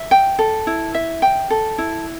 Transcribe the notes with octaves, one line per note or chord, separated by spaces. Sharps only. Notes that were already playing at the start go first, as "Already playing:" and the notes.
Already playing: E5
G5
A4
E4
E5
G5
A4
E4